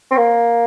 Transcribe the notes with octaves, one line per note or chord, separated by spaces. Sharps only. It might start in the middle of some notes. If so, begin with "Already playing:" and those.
C4
A#3